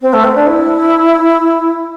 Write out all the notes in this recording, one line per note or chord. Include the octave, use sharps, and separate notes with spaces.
C4
A3
C4
D4
E4